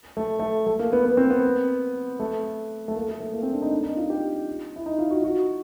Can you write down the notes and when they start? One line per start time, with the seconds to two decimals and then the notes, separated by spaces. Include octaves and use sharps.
0.17 A3
0.40 A3
0.67 A3
0.79 A#3
0.93 B3
1.05 B3
1.17 C4
1.30 B3
2.20 A3
2.88 A3
2.96 A#3
3.09 A3
3.20 A3
3.33 A#3
3.43 C4
3.53 D4
3.62 D#4
3.71 D4
3.83 D#4
3.97 F4
4.10 G4
4.76 E4
4.86 D#4
4.99 F4
5.11 F#4
5.24 F#4